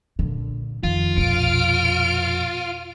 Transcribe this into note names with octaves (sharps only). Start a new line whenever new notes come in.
A#2 D3
F2 D#3 F4
A#1 B2 F6 D7